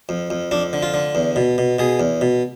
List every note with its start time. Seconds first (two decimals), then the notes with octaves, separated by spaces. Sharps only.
0.09 F2
0.30 F2
0.51 F2 D4
0.73 D3
0.83 F4
0.94 D3
1.15 E2
1.36 B2
1.58 B2
1.79 B2 G#4
2.00 E2
2.21 B2